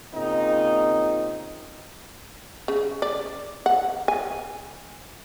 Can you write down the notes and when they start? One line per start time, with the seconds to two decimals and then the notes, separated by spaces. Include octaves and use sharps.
0.14 A#2 C#3 C4 D#4
2.68 C#3
3.02 D5
3.66 F#5
4.08 G#5